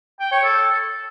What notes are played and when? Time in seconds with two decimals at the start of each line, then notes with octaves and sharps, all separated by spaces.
0.20 G5
0.32 C#5
0.44 A4